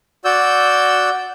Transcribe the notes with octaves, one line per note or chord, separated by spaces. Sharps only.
F#4 D5 E6 G6